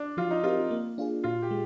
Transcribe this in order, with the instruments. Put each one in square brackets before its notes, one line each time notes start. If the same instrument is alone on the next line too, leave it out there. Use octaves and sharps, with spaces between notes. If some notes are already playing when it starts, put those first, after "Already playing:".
Already playing: [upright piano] D4
[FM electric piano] F3 [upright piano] F4
[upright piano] D#4
[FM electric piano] C4 G4 A#4 [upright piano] F4
[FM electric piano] A#3
D4 F4 G#4
[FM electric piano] A#2 [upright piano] F4
[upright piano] G4
[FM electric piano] G#3